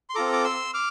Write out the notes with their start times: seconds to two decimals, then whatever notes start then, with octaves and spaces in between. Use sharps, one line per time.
0.10 C6
0.15 C4 F4 A4 A#5 D6
0.33 D6
0.45 C6 E6
0.74 D6 F6